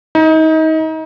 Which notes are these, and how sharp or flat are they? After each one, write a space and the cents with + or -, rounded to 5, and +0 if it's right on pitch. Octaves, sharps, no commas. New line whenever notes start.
D#4 +30